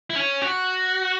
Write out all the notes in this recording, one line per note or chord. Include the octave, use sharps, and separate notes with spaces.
E4
C#4
F#4